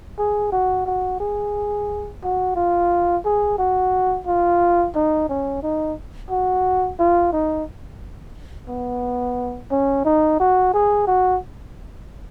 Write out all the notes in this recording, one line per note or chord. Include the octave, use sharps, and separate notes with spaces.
G#4
F#4
F#4
G#4
F#4
F4
G#4
F#4
F4
D#4
C#4
D#4
F#4
F4
D#4
B3
C#4
D#4
F#4
G#4
F#4